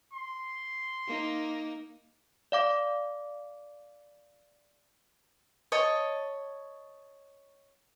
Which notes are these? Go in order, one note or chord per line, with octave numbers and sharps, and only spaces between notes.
C6
A#3 D#4
D5 F5 D6
C#5 D#5 A5